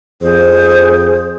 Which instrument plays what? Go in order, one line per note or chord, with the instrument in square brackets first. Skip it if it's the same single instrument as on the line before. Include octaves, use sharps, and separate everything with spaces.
[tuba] F2 [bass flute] G#4 [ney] C5